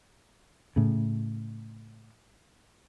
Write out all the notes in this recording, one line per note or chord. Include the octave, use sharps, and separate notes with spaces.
A2 C#3